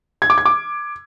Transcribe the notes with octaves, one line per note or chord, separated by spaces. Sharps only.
G#6
D6
G#6
D6